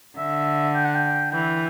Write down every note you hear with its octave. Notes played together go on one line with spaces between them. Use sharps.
D3 E5
G5
F#5
G5
E3 G5